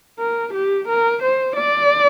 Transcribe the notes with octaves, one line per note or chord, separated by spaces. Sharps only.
A#4
G4
A#4
C5
D5